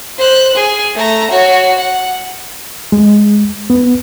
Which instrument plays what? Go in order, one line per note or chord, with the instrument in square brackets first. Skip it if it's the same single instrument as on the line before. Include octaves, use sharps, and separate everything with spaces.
[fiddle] C5 F#6
G#4 G#5
A3 A#5
F#4 C#5
F#5
[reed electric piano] G#3
B3